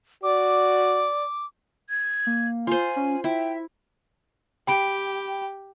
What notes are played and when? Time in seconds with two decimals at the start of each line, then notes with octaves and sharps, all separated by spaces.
0.23 F#4 D5 D6
1.90 G#6
2.27 A#3
2.67 F4 C5 G#5
2.96 C#4
3.24 E4 E5 G5
4.67 G4 G5 B5 D7